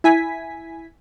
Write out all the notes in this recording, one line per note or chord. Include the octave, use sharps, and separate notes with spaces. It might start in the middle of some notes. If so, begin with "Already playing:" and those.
E4 G#5 B6